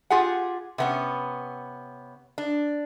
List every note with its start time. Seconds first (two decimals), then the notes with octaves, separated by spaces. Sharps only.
0.10 F4 G4 G#4 F#5
0.78 C3 B3 C#4
2.38 D4